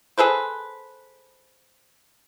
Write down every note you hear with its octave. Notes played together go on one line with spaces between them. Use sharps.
G#4 A4 B4 C5